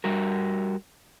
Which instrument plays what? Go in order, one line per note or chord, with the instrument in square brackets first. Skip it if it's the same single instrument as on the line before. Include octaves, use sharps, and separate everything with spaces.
[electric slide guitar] G3 F#4 A#4